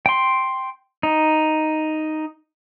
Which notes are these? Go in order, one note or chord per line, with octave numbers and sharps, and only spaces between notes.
G5 C6
D#4